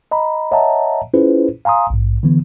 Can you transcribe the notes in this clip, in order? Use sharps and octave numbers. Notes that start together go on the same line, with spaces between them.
D#5 A#5 B5
C#5 D#5 E5 F#5 A5 A#5
C#4 E4 F4 G#4 B4 C5
F5 G#5 A#5 C6 D#6
A#1 G#2
D3 E3 B3